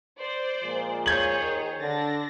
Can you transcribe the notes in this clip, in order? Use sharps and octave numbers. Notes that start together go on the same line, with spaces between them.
C5 D5
A#2 F3 G#3
G#4 C5 C#5 G6 G#6 F#7
D#3
D3 D4 A6 A#6